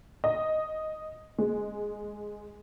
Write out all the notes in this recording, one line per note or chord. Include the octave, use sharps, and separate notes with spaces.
D#5
G#3